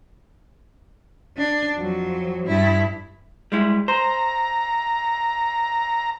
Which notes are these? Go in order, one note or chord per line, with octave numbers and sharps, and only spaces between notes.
D4
F2 F#3
G2 E4
G3 G#3 E4
C5 A#5